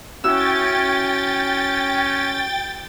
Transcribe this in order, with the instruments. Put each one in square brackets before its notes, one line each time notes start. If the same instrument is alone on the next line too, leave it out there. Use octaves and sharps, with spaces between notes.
[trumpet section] C#4 [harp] E4 F#4 E6 [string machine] G5 A6